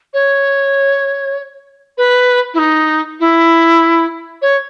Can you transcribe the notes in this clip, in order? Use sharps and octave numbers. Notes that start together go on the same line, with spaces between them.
C#5
B4
E4
D#4
E4
C#5